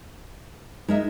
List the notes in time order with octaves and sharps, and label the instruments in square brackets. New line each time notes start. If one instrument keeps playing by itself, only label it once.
[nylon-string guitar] G#3 A#4 E5 [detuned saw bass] D#4